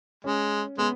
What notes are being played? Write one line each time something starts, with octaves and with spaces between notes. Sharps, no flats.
G#3 C#4
G#3 B3